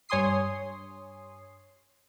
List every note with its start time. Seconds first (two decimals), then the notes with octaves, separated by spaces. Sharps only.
0.09 G2 C#5 G#5 C6 D#6 C7